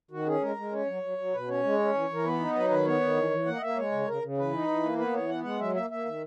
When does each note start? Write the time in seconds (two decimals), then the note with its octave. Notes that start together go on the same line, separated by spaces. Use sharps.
0.11 D#3 F#4
0.26 C#4 G#4
0.42 G#3 A#4
0.57 G#3
0.72 C#4 C#5
0.87 F#3
1.03 F#3
1.18 F#3
1.33 B2 B4
1.48 C#4 C#5
1.63 G#3
1.79 C#4
1.94 E3
2.09 E3
2.14 A#4
2.24 B3 B4
2.40 D#4
2.55 F#3 B4
2.70 D#3 B4
2.85 B3 C#5
3.01 D#3
3.15 E3
3.31 E3
3.46 A#3 F#5
3.57 D#5
3.61 A#3 E5
3.77 G#3 C#5
3.92 C#3
4.07 C#3 A#4
4.22 C#3
4.37 E3 B4
4.53 D#4
4.68 E3
4.83 A#3
4.98 B3 B4
5.14 E3 C#5
5.29 B3 F#5
5.44 G#3 F#5
5.59 F#3 E5
5.74 A#3 E5
5.90 A#3 E5
6.05 D#3